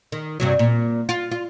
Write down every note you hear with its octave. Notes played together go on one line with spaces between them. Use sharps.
D#3
G2 C3 F#3
A#2
F4
F4